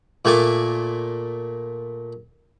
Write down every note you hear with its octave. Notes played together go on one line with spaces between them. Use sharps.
A#2 A3 G#5 D6